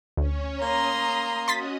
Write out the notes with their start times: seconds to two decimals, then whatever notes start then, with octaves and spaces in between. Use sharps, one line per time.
0.17 D2 C#4 C#5
0.62 A#3 A#5 C6 D#6
1.48 C#4 F#4 D#5 C6 A6 B6